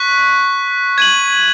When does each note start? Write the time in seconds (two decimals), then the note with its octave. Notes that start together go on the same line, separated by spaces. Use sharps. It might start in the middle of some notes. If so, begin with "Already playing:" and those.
Already playing: C#6 F#6 B6
0.98 G#6 D#7 F#7